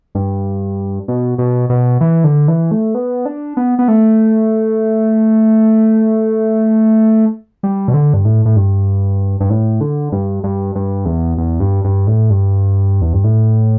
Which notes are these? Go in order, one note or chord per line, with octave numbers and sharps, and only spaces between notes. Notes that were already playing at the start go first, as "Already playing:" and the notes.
G2
B2
B2
B2
E3
D3
E3
A3
B3
D4
B3
B3
A3
G3
B2
D3
G2
A2
A2
G2
G2
A2
D3
G2
G2
G2
E2
E2
G2
G2
A2
G2
E2
G2
A2